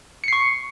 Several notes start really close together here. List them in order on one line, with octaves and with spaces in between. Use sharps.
C#7 C7 C#6